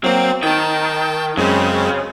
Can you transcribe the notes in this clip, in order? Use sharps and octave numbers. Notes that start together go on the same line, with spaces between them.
F#3 A#3 C4
D#3 G5 A5
F#2 C#3 G#3 C4